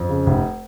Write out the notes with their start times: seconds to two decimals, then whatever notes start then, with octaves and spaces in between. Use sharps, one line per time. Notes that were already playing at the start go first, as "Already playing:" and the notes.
Already playing: F2
0.09 C#3
0.26 F1